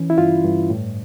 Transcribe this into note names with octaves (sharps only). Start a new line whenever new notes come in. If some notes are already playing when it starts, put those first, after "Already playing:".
Already playing: E3 C#4
E4
G2 F4
G2
A2